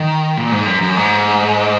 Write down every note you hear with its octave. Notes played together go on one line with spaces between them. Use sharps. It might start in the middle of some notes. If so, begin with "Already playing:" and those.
Already playing: D#3
A#2
G#2
F#2
F#2
G#2